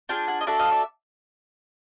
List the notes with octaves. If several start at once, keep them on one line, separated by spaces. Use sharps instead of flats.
D4 F4 G#4 G5 A5
F#5 G#5
D#5
D4 F#4 A4 D5 E5
D#5 F5
D5 E5